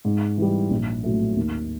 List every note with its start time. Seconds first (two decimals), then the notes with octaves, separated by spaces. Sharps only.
0.05 G#2
0.38 E3 G3
0.70 A#1
1.04 A2 F#3 A3
1.36 D#2